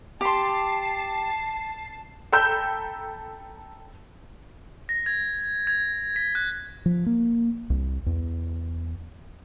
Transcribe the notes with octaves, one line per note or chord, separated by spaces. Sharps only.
G4 A5 C6 C7
A4 G5 A#5 B5 E6 G6
A#6
G#6
G#6
B6
F#6
F3
A#3
C2
E2